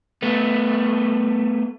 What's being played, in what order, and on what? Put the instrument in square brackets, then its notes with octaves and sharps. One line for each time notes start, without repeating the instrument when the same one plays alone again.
[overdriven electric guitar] A3 B3